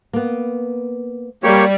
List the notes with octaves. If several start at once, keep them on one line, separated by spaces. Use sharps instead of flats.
A#3 B3
G3 A#3 G4 C#5